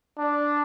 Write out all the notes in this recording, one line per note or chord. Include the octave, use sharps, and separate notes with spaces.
D4